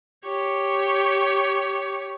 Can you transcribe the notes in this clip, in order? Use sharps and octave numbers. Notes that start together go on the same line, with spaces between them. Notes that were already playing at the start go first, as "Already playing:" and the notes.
G4 C#5